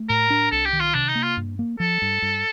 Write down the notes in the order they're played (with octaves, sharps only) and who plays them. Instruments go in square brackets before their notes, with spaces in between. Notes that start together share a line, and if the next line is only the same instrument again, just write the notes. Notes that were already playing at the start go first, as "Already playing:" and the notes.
Already playing: [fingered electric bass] A3
[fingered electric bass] A2 [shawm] A#4
[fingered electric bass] D4
[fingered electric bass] C2 [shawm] A4
[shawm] G4
[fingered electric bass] D#3
[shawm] F4
[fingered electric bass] C3 [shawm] D4
[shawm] D#4
[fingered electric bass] A#3
[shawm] F4
[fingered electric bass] G2
A#3
[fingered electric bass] F3 [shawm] A4
[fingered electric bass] G2
G2